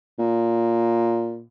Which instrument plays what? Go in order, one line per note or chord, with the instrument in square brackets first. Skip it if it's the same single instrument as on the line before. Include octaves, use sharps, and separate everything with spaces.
[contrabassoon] A#2